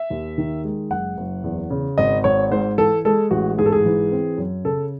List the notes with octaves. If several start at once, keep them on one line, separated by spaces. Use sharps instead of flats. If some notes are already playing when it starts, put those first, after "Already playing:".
Already playing: E5
D#2
D#3
G#3
F#1 F#5
F#1
E2
C#3
G#1 D#5
G#1 C#5
G#2 C5
E3 A4
G#3 A4
A1 F#4
G#2 G#4
A4
G#4
E3
C4
F#2
C#3 A4